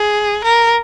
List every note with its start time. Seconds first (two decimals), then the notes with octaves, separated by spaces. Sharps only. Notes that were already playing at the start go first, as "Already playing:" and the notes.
Already playing: G#4
0.45 A#4